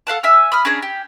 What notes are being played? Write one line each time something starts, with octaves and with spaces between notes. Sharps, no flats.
A4 F5 F#5 A5
E5 G#5 E6 F6
B5 D#6 F6
C#4 D4 G#4 A#5
G4